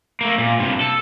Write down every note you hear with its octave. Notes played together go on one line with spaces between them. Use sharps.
A3 A#3
A#2
G2 C3
A4